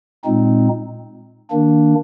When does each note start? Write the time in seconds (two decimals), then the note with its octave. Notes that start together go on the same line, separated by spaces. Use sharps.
0.24 A#2 G#3 C4 D#4
1.51 D#3 A#3 D4